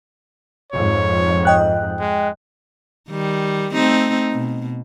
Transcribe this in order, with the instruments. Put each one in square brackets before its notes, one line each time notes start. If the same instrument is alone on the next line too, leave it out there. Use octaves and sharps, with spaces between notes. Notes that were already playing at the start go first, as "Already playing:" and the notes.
[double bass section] F2 G#2 [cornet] C#5
[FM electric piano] D#5 G5 F#6
[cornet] G#3
[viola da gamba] D#3 G3
A3 C4 D#4
B2